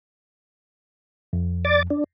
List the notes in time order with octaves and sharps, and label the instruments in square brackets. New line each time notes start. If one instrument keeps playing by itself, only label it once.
[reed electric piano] F2
[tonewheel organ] D5 D6 A6
D4